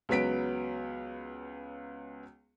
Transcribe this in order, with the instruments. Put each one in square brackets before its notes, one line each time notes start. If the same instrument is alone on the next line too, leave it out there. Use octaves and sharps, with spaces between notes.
[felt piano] C#2 F#3 B3 B6 D7